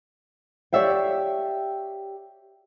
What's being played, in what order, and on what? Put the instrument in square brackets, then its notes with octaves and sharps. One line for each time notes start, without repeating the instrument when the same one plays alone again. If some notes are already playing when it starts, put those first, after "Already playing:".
[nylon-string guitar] G4 C#5 D5 E5 F5 G5